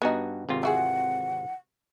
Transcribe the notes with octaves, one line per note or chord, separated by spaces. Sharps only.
G2 B3 D#4 F#4 G#5
G#1 C3 F4
E3 F#4 G#4 F#5